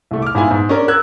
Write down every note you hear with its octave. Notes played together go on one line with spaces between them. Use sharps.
C2 A3
D6 F6
G#2 B3 E4 F4 F5 G#5
G#2
C#4 D4 A#4
A#4 E6 F#6 G#6